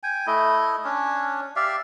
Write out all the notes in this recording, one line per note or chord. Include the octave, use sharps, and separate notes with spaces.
G5 G#5
A3 E4 D#5
C#4 D4
G4 D5 E5 F5